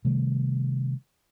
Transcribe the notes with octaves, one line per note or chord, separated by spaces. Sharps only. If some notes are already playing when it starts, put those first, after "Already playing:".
C3 D#3 G3 A3